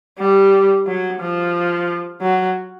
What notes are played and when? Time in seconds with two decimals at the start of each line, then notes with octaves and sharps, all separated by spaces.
0.19 G3
0.87 F#3
1.20 F3
2.22 F#3